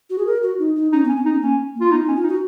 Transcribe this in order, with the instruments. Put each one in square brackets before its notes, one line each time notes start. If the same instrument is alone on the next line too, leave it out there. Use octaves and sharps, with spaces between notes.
[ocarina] F#4
G#4
A#4
F#4
D#4
D#4
[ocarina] C#4 [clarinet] D#4
[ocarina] B3
[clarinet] C#4
[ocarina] B3
[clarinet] D#4
[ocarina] C#4
[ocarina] A#3 [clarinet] C#4
[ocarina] A#3
[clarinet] F4
[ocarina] B3 [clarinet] D#4
[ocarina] D#4
[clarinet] C#4
[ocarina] F4
[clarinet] D#4
[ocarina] F#4